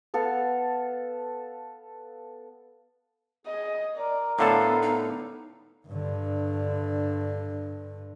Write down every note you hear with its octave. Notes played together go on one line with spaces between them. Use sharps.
B3 A4 F5
G#4 D#5
A#4 D5
A2 D3 B3 A4 F5
D#4
G2 D3